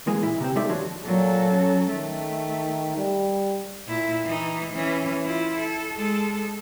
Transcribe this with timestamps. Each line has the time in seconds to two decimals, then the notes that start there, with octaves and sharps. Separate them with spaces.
0.07 E3 G#3 A#3 G#4
0.23 A#2 E4
0.40 C3 C4
0.56 G3 G#3 D#4 A4 D5 E5
0.69 D#2 F3 D4 F#4 C#5
1.05 A#2 F#3 A4
1.51 C#4
1.90 D#3 A3
2.97 G3
3.88 A#2 E4
4.25 E3 D#4
4.73 E3 C#4
5.25 E4 F4
5.58 A4
5.97 G#3 A4